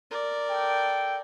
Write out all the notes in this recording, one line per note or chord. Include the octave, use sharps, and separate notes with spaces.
A#4 D5
A4 G5